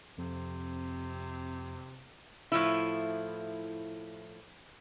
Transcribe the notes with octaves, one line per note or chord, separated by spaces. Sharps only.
F2 C3
A2 F3 E4